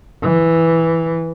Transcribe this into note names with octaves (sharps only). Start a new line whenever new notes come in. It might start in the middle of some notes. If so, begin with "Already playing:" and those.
E3